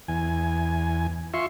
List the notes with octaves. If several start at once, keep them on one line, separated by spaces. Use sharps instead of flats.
E2 G#5
F4 E5 C6 C#6